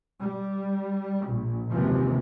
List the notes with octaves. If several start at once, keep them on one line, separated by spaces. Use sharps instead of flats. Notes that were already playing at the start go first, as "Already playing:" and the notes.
G3
A#1
F#1 D#2 C3 E3 F3 G#3